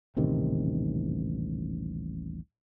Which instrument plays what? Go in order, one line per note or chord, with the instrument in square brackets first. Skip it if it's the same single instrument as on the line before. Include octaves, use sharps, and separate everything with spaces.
[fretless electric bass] D#1 A1 C3 D#3